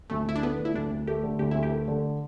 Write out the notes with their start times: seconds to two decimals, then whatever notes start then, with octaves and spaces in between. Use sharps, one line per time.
0.10 D2 A3
0.26 D2 E4
0.36 D4
0.43 A3 B3
0.59 D3
0.65 E4
0.74 D2 D4
0.91 D2
1.08 A3 G4
1.23 D3
1.39 D2 G4
1.51 D2 E4
1.63 G4
1.71 A3
1.88 D3